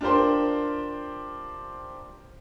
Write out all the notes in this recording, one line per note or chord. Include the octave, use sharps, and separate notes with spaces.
D4 F4 G4 A#4 C5 C6